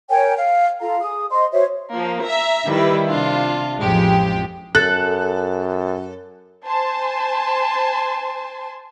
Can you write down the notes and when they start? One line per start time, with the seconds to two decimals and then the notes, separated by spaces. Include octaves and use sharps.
0.09 A#4 C#5 G5 G#5
0.36 F5
0.79 F4 A4 F5 A#5
1.00 G#4 D#6
1.30 C5 D#5 C6
1.52 F#4 C5 C#5 E5
1.93 F3 A#3
2.23 E5 A#5
2.69 D#3 G3 E4 B4
3.07 C3 D4 F4
3.81 A1 F2 F3 G#3 G4
4.75 F#2 A4 F#6
6.67 C5 G#5 A5 C6